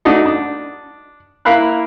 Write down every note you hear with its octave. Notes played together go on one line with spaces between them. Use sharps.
A3 D4 D#4 F#4 D#5
D4
A#3 E4 A#4 F5 B5 F#6